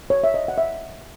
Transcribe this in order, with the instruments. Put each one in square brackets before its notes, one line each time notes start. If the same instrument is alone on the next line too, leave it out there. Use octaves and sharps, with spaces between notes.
[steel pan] C#5
E5
D#5
F#5
E5